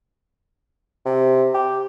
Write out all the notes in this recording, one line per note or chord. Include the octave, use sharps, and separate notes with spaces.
C3
G4